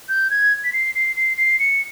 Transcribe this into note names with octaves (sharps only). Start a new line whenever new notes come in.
G6
G#6
B6
C7
C7
C7
C7
C#7